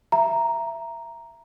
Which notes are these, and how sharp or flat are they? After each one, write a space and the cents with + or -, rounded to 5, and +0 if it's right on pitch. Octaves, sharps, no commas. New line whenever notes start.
E5 +15 A#5 +0